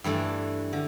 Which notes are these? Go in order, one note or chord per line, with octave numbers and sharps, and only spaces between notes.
G2 E3 A3 D4 A4
D3